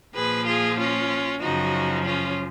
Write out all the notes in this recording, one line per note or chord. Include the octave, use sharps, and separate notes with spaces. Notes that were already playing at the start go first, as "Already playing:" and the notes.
A#2 F3 G#4 B4
F4 G#4
C#4 F4
F#2 C#3 F3 D#4 F#4
C#4 F4